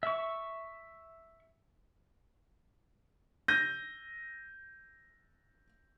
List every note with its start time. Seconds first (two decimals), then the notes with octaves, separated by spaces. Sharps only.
0.03 E5 C#6
3.48 G6 A#6 D#7